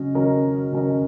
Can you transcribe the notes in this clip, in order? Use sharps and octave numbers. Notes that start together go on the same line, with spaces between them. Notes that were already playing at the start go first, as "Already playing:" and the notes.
Already playing: C#3 F#3 C#4 D#5
C#3 F#3 C#4 A#4 D#5
C#3 F#3 C#4 A#4 D#5